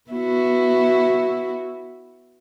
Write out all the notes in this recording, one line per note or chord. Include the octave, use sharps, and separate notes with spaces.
B3 E4 F#4